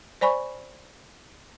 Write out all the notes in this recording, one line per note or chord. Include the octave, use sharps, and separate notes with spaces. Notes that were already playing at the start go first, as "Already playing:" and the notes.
C5 D5 G#5 B5 C#6